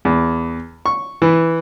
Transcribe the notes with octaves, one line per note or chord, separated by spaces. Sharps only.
E2
C#6
E3